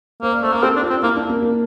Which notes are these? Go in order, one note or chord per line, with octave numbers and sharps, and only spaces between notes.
A#3 C5
D5
A3 C5
A#3 A#4
C4 A4
D4
F4
C4
A#3 E4
D4
A#3
A#3